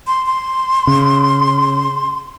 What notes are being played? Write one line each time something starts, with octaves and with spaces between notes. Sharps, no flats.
C6
C6
C#3